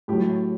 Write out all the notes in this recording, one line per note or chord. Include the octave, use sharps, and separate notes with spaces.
A2 F#3 G4